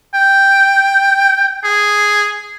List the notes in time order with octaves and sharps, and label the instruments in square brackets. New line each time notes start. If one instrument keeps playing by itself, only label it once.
[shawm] G5
G#4